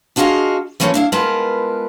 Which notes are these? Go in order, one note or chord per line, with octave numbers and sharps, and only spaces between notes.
D4 F4 F#4 G#4 D#5 F5
E3 F3 A3 A#3 C4 C#4
D4 E4 F5
G#3 B3 F4 A#4 B4 A5